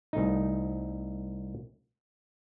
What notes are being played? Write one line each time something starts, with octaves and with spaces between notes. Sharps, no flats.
C2 A3 D#4